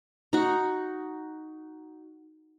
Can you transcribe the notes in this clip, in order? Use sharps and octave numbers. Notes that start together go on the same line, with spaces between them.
D#4 F#4